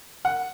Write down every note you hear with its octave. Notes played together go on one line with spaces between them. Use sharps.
F#5